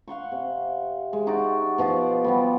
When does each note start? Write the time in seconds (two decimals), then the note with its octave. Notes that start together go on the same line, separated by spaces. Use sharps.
0.08 F5 F#5 C6 C#6
0.32 C3
1.13 G#3
1.27 D#4 F#4 D5
1.78 B2 F3 F#4 D5
2.24 F3 G3 B3